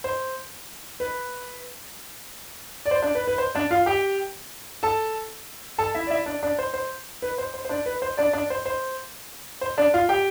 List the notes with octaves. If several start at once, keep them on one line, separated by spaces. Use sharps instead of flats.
C5
B4
D5
C5
D4 D5
B4
B4
C5
D4 D5
F4 F5
G4 G5
A4 A5
A4 A5
E4 E5
D5
E4 E5
D4 D5
D4 D5
C5
C5
B4
C5
C5
C5
D4 D5
B4
C5
D4 D5
D4 D5
C5
C5
C5
D4 D5
F4 F5
G4 G5